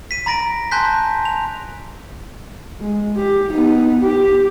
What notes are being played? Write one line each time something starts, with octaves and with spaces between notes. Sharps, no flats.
B6 D#7
A#5 B5 A6 A#6 D7
G#5 A5 C6 F#6 G6 B6
F7
G#3
G4
B3 D#4
G4